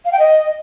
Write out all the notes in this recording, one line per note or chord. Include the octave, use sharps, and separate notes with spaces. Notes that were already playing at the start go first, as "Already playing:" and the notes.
F5
G5
D#5